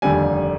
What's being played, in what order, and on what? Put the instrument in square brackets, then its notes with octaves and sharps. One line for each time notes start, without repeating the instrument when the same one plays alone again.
[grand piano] F1 D#2 D3 G3 G#5